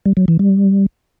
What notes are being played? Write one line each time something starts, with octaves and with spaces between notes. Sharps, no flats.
G3
F#3
E3
G3